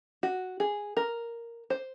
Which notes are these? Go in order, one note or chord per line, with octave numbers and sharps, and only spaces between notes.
F#4
G#4
A#4
C5